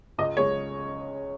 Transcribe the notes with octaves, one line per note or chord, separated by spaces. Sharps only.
C#2 D#5
C#3 G#3 C#4 C#5